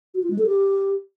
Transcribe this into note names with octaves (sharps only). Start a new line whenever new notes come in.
F#4
F4
G#3
A4
G4